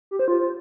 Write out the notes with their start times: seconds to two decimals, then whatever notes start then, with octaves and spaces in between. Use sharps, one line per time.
0.11 G4
0.19 C5
0.28 F4